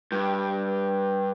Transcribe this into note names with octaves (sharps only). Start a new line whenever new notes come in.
G2